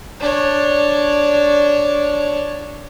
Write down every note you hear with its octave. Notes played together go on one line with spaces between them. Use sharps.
D4 C#5